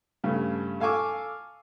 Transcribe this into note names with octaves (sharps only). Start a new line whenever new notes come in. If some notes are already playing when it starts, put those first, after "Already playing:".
G2 C#3 A3
A4 F5 G#5 C#6 D6 E6